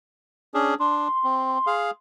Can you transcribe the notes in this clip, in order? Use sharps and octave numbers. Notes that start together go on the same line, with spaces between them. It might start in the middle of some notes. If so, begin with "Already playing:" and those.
C#4 D4 G#4
D4 C6
C4
G#4 F5